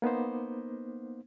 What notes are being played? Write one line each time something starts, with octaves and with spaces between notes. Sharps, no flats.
A#3 B3 D#4 C5